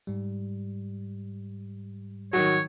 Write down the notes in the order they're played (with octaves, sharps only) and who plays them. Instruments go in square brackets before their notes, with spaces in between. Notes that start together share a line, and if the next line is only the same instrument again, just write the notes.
[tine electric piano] G#2 G3
[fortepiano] D#3 F#3 [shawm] C#5